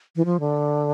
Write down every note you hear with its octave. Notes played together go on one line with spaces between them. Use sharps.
E3
F3
D3